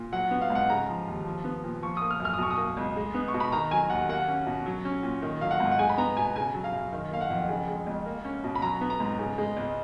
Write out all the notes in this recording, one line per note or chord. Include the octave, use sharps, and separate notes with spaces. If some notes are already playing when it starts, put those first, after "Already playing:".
Already playing: A#2
F#3 F#5
B3
F5
G#2
F#5
C#3 A#5
F3
D#2
F3
B3
A#2
F3 C#6
A#3 D#6
F6
F#2
F6
D#6
B2 C#6
D#6
A#3
C#2
G#3
B3
C#6
B2
B5
D#3 A#5
F#3 G#5
D#2 F#5
A#3 F#5
C#4
B2
F#3
C#4
A#2
D#3
F#3 F5
F#5
G#2
F#5
G#3 G#5
B5
B3 A#5
B2 G#5
C#3 G#5
F#3
F5
F#2
D#3
A#3 F5
F#5
F2
C#3
G#3
C#2
A#3
C#4
B2
B5
F#3 A#5
B3
A#5
G#2
C#3
G#3
C#2